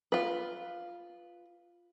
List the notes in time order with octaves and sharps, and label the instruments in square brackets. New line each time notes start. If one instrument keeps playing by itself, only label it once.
[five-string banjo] F4 B4